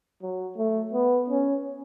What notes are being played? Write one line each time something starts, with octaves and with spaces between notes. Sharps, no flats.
F#3
A3
B3
C#4